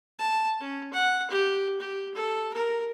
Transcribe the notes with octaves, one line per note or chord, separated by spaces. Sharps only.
A5
C#4
F#5
G4
G4
A4
A#4